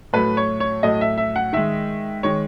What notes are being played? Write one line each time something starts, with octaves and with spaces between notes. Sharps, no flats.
A2 F#3 A3 B4
C#5
C#5
A2 F#3 A3 D#5
E5
E5
F#5
D#3 G#3 E5
D#3 G#3 C#5